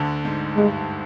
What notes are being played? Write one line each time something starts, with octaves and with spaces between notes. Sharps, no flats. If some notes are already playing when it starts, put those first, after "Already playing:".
Already playing: D2 D3
G#2
G2 G#3